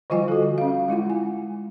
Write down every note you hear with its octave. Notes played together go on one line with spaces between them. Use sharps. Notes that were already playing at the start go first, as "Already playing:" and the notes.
D3 F3 G3 F4 D#5 G#5
F#4 A4
C#4 F5
G#3 E4 F4 F#5
G#5